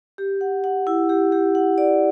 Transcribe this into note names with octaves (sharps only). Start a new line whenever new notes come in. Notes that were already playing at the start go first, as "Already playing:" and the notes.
G4
F#5
F#5
E4
G4
G4
F#5
D5